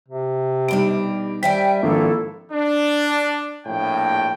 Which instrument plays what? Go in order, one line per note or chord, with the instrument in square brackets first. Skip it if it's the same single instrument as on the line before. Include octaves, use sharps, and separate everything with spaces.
[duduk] C3
[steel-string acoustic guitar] B2 D4 D#4 [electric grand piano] G3 D7
[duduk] G3 [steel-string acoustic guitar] C5 E5 G#5 [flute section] G5 [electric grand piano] B6
[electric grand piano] G#1 F3 D4 [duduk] A#3 [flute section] E4 A4
[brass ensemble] D4
A#1 A2 G5